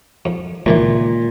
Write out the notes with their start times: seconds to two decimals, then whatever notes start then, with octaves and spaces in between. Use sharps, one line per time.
0.25 F2
0.66 C#2 A#2 D#3 E3